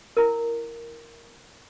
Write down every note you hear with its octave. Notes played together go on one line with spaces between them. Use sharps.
E4 A#4